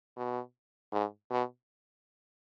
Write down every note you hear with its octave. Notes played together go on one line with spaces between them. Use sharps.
B2
G#2
B2